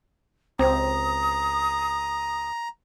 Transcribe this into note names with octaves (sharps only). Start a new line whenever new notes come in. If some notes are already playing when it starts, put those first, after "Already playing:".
C#2 C4 A#5 D#6